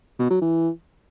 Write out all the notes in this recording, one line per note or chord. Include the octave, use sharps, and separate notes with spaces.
B2
F#3
E3